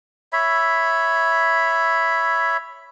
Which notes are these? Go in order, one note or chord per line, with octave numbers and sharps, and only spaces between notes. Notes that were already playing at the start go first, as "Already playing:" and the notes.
C#5 E5 B5